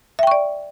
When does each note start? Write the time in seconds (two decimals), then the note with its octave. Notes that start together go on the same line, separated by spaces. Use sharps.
0.19 E5
0.23 G5
0.27 C#6
0.31 D5